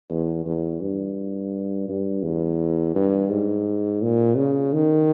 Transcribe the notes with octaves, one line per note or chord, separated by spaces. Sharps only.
E2
E2
G2
G2
E2
G2
G#2
A#2
C#3
D#3